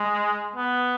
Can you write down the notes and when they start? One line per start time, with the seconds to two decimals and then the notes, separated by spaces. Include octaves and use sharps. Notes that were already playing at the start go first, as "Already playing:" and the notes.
Already playing: G#3
0.56 B3